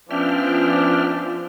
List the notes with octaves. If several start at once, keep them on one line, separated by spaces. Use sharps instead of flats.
F3 B3 C#4 D4 E5 G5 F6